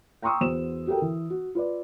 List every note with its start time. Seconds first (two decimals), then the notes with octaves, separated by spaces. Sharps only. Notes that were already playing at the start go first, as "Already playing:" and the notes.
0.22 G5 A#5 C6 C#6 D#6 E6
0.41 E2 F#4 C5 E7
0.87 F#4 G4 A4 A#4 G5
1.02 E3
1.30 F#4
1.55 F4 B4 D5